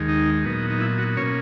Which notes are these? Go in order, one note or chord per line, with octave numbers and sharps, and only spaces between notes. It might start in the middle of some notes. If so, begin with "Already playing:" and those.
Already playing: D#2 D#3 G#3
D#4
A#2 F#3 B3 D#4
D#4
E4
F#4
B2 A#3 C#4 C#5